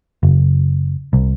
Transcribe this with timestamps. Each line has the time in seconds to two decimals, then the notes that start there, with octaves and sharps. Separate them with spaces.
0.23 F#1
1.13 C2